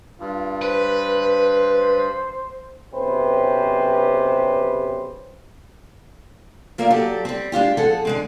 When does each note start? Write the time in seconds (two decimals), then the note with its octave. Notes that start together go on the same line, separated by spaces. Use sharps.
0.20 G2 F4
0.62 B4 C5
2.94 B1 C3 C#4 G4 B4 C5
6.78 F3 A#3 A#4 D5 E5
6.90 F#3 G4 A4 D5
7.25 G3 C4
7.52 G#3 D4 F4 G4
7.77 F3 G#4 A4 F#5
8.05 D3 G#3 C4